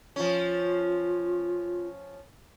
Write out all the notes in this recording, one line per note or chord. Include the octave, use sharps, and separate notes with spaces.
F3 C#4 F4